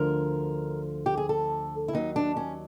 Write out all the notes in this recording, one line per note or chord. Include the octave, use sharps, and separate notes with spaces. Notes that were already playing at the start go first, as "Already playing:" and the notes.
Already playing: D2 D3 F3 A#4
G4
G#4
A4
E4
D#2 D#3 F#3 D#4
D4
C#4